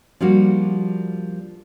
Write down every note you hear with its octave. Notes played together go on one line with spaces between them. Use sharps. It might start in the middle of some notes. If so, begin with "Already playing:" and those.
F3 G3 A#3 D4 F4 F#4